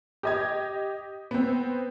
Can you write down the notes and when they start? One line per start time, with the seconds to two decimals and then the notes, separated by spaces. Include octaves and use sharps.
0.23 G4 D#5 G#6
1.31 B3 C4